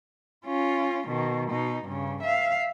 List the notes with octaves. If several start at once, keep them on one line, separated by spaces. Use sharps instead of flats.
C#4 F4
B2 D#3
B2 D#4
G2 C#3
E5 F5